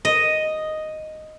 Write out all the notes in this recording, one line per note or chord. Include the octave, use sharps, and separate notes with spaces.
D#5